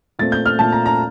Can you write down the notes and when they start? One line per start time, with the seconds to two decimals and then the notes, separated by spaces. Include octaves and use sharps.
0.19 A#2 A3 C4 A6
0.32 G6
0.46 F6
0.59 A#2 A3 C4 A5
0.72 A#5
0.86 A#5